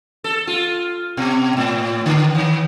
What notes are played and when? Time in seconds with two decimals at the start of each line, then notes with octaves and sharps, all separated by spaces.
0.24 A4
0.47 F4
1.17 B2
1.57 A2
2.06 D3
2.35 D#3